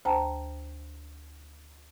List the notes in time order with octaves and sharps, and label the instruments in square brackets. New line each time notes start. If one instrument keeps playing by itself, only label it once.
[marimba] D2 C5 G5 A5 A#5